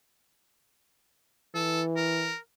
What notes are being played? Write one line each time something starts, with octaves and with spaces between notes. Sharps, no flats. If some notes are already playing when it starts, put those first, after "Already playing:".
E3 A4
A#4